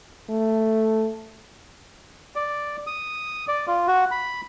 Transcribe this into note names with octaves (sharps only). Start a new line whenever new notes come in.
A3
D5
D#6
D5
F4
F#4
B5